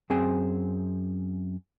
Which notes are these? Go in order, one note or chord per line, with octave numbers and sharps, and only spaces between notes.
F#2 C4 G#4 C5 G#5